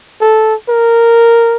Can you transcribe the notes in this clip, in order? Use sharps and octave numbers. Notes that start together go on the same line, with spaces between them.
A4
A#4